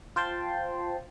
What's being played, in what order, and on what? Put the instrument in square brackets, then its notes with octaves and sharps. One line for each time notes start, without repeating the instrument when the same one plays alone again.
[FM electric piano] F4 C5 G5 A5 C6